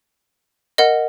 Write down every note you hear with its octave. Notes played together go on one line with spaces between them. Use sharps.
A#4 D#5 F#5